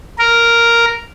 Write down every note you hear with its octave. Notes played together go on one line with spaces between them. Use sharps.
A#4